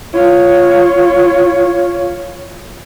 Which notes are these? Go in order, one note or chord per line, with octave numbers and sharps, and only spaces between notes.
F4 C#5